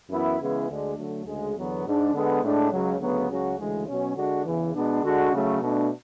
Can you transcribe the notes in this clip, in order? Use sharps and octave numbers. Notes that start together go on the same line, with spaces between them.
F#2 E3 B3 E4
C#3 E3 G#3 B3 E4
D2 D3 G#3 D4
D3 F#3 A3
D2 C#3 G#3
E2 D3 F#3 B3
G#2 G#3 D4
D3 G#3 B3
A2 G#3 D4
C#2 C#3 F#3
D2 C#3 F#3 B3
C#2 C#3 F#3 C#4 F#4
D2 C#3 E3 G#3
B2 F#3 C#4
D3 G#3 D4 F#4
E2 C#3 E3
B2 G#3 B3 D4
D3 G#3 D4 F#4
C#3 F#3 A3
B2 A3 D4